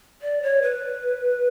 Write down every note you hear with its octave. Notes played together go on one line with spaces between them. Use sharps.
D5
C#5
B4